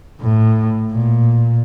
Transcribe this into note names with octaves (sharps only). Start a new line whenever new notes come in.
A2
A#2